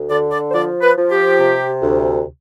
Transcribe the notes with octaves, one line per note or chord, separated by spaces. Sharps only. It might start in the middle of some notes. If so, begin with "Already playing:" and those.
Already playing: D2
D3 D5
D5
C5
F3 D5
B4
F3
G4
C3
D2